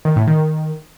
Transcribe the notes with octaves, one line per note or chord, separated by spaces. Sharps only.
D#3
A2
D#3